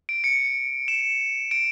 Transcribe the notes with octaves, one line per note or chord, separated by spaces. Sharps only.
D7
C#7
E7
D7